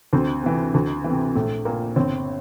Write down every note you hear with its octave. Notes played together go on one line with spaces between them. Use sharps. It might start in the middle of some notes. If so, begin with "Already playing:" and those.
D2 C4
C3 E3
D2
E3
C3
A#1 A3
A#2 A#3
G1 C4